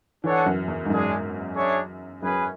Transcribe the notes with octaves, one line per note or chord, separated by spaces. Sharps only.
E3 D4 A4 C#5 F#5
F#2
E2
G#2
F#2 G#3 D4 G#4
D4 G#4 C#5 E5
F#2 C#4 G#4 B4